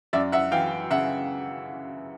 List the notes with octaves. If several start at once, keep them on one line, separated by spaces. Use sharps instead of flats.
F#2 D5 E5
E5 F#5
E3 F5 G5
C#3 E5 F#5